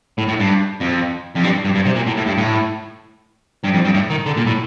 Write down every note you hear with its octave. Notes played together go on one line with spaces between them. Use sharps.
A2
A2
G2
F2
F2
G2
G2
G2
C3
A#2
A2
A2
G2
A2
G2
F2
G2
A2
D#3
D3
A#2
A2